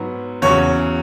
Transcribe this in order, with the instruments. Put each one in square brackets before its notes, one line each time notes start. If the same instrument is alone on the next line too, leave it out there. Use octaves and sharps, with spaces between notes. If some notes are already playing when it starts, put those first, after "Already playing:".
Already playing: [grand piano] G#2 F#3 B3
E2 C#3 F#3 C#4 C#5